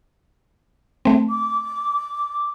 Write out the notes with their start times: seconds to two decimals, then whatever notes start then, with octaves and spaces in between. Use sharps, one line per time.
1.05 A3 C4
1.30 D6